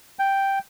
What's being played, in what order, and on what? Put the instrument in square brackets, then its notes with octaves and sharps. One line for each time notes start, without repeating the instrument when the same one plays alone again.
[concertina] G5